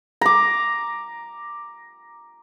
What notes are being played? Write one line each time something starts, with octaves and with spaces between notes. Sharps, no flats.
A#5 D6